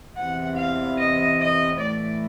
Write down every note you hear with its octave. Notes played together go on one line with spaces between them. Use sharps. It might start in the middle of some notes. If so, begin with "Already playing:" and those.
E2 C3 E3 F#5
F5
D#5
D#5
A2 E3 D5